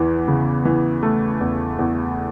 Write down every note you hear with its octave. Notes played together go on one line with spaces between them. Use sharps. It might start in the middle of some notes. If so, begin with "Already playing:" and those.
Already playing: E2 E3
C#3
E3
A3
E2
E2